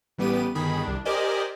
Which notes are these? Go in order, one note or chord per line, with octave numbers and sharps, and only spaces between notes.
A1 G3 B3 G4 D#7
G1 D#3 G#4 B5
C2 D4
G4 A#4 C5 D5 D#5 G#5